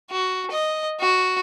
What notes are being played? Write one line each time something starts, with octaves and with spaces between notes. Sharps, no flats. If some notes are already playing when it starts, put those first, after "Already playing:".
F#4
D#5
F#4